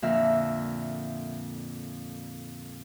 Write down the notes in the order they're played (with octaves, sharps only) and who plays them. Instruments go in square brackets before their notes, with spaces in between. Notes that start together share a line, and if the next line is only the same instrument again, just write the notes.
[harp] F2 A#2 D3 E5 F6